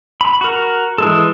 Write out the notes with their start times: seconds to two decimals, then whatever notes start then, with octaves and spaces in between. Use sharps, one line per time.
0.21 B5
0.41 F#4 A#4
0.98 E3 G#3 A4